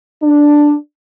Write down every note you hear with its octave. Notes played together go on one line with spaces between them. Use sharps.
D4